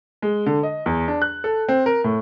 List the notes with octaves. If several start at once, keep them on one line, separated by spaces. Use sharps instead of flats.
G#3
D3
D#5
E2
D4
F#6
A4
C4
A#4
A2